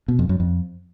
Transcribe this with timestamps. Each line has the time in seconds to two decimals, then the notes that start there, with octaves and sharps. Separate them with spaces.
0.08 B2
0.19 F2
0.29 F#2
0.40 F2